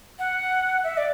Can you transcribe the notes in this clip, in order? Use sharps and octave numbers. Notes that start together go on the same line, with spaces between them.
F#5
E5
D5